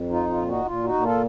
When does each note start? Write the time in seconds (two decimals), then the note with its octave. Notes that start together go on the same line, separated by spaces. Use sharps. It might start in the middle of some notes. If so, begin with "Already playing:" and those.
Already playing: F2
0.10 D#4 F4
0.29 F4
0.37 A#2
0.47 D#4 F#4
0.65 A#2 F4
0.84 D#4 F#4
0.93 A#2
1.02 F4 A4